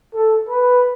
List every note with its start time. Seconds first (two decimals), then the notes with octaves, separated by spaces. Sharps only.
0.14 A4
0.48 B4